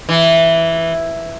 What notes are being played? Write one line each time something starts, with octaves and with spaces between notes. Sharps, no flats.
E3